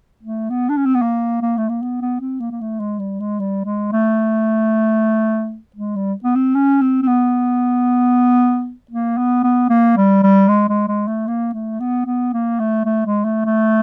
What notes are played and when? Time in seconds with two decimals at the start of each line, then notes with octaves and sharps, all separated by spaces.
0.23 A3
0.50 B3
0.69 D4
0.77 C#4
0.86 C4
0.95 B3
1.02 A#3
1.42 A#3
1.57 A3
1.69 A#3
1.82 B3
2.01 B3
2.21 C4
2.40 A#3
2.52 A#3
2.61 A3
2.80 G#3
2.99 G3
3.20 G#3
3.40 G3
3.65 G#3
3.92 A3
5.76 G#3
5.96 G3
6.24 B3
6.35 C4
6.55 C#4
6.82 C4
7.03 C4
7.07 B3
8.91 A#3
9.17 B3
9.44 B3
9.69 A#3
9.97 G3
10.23 G3
10.48 G#3
10.69 G#3
10.88 G#3
11.08 A3
11.27 A#3
11.53 A3
11.80 B3
12.06 B3
12.33 A#3
12.60 A3
12.85 A3
13.06 G#3
13.25 A3
13.45 A3